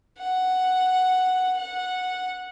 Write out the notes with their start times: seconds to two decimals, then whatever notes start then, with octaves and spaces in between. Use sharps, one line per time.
0.18 F#5
1.57 F#5